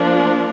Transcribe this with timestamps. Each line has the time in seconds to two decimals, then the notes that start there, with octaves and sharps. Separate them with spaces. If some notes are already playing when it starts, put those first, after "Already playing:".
Already playing: F3 A#3 D4